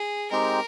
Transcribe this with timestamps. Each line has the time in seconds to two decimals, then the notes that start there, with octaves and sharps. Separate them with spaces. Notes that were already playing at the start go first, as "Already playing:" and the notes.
Already playing: G#4
0.31 G#3 C4 D#4 G4 A#4